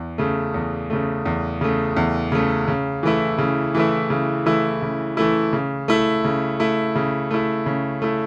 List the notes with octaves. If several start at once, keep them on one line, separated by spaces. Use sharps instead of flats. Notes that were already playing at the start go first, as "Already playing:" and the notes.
Already playing: E2
C#3 A3
E2
C#3 A3
E2
C#3 A3
E2
C#3 A3
C#3
E3 A3 E4
C#3
E3 A3 E4
C#3
E3 A3 E4
C#3
E3 A3 E4
C#3
A3 E4
C#3
A3 E4
C#3
A3 E4
C#3
A3 E4